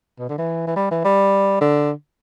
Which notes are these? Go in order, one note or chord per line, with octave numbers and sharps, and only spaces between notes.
B2
D3
E3
E3
G3
E3
G3
D3